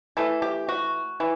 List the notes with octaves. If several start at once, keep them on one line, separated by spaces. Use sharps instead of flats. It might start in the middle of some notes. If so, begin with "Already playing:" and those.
E3 A3 A4
G4
F#4
E3